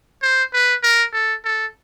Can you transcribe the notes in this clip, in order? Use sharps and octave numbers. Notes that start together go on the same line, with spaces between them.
C5
B4
A#4
A4
A4